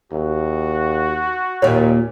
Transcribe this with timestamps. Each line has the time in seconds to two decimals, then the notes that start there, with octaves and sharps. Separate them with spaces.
0.12 D#2 F#4
1.62 D#2 A#2 A#3 C#5